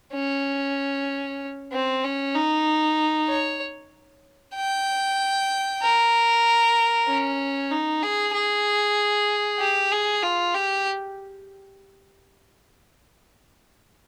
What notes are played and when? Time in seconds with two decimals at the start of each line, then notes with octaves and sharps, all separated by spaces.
0.14 C#4
1.72 C4
2.04 C#4
2.35 D#4
3.29 C#5
4.56 G5
5.82 A#4
7.08 C#4
7.72 D#4
8.03 G#4
8.34 G#4
9.60 G4
9.92 G#4
10.23 F4
10.55 G4